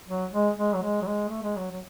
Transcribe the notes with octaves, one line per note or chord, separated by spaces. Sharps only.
F#3
G#3
G#3
F#3
G#3
F#3
G#3
A3
G#3
F#3
F#3